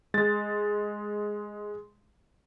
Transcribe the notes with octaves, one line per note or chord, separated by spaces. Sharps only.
G#3 A6